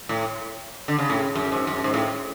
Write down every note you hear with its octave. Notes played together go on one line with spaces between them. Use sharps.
A2
D3
C#3
A2
F#2
G#2
F#2
G#2
A2